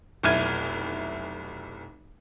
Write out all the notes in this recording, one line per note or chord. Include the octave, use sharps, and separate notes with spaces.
F1 B1 E4 F6 G#6 D#7